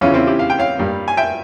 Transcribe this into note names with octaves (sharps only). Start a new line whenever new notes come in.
E2 C#3 E3 C#4 F4
C4 E4
E4 G4
F5
G5
C#5 F5
G2 G3 A#3
G#5
E5 G5